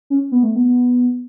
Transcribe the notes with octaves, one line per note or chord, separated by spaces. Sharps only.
C#4
B3
A3
B3